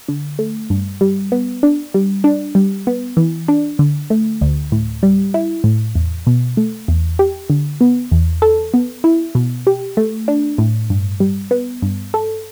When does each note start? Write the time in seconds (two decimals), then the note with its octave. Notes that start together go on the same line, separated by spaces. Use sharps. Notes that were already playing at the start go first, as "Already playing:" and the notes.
0.08 D3
0.39 A3
0.70 G2
1.01 G3
1.32 B3
1.63 D4
1.94 G3
2.24 D4
2.55 G3
2.87 B3
3.17 E3
3.48 D4
3.79 D3
4.10 A3
4.41 D2
4.72 A2
5.03 G3
5.34 E4
5.64 A2
5.95 E2
6.27 B2
6.57 A3
6.88 E2
7.19 G4
7.50 D3
7.81 B3
8.11 E2
8.42 A4
8.74 B3
9.04 E4
9.35 B2
9.67 G4
9.97 A3
10.28 D4
10.58 A2
10.90 G2
11.20 G3
11.51 B3
11.82 G2
12.14 A4